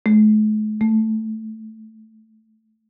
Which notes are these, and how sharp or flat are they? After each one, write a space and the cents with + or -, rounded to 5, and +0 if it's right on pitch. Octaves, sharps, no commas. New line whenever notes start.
A3 -45
A3 +0